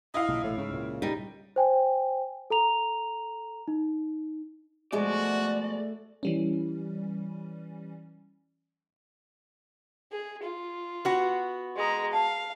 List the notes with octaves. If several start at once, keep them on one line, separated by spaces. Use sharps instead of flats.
E4 D#5 F5
B1 A#2 C#3
A1 A2
G#2 C#3
C#2 A#2
G3 D#4
C5 G5 G#5
A4 A#5 F7
D#4
B2 F3 G#3 A3 F#4 D5
E3 G3 C#4
G#4
F4
B3 F#4 F#5
G#3 A#5 C6 D#6
F5 A5